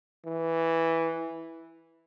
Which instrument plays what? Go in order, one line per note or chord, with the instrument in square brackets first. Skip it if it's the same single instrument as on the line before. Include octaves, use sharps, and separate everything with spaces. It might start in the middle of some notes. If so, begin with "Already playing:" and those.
[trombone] E3